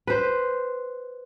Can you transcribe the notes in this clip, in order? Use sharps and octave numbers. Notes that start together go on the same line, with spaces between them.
B4 C5